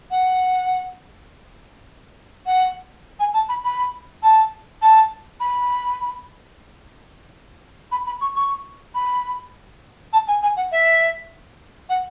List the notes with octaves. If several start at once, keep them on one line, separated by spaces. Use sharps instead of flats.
F#5
F#5
G#5
A5
B5
B5
A5
A5
B5
B5
B5
C#6
C#6
B5
A5
G#5
G#5
F#5
E5
F#5